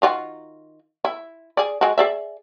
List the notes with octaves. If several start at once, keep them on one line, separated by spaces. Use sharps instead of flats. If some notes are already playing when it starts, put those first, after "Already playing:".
D#3 F4 F#4
E4
G#4 D5
G#3 F#4
G#4 D5 E5